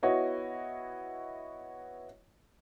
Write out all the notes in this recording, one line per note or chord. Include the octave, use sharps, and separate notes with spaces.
B3 E4 F#4 C#5 D#5